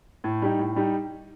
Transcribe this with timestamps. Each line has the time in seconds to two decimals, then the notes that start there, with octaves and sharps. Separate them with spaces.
0.24 A2
0.42 G3 D#4
0.59 A2
0.76 G3 D#4